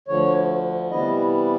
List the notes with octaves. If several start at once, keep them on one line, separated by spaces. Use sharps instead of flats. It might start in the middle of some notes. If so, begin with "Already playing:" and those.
D2 D3 F3 C#5
C3 E3 G3 B3 E4 D#5